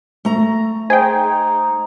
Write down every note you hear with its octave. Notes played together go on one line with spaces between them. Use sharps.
A3 A#5
D#4 G#4 C5 G5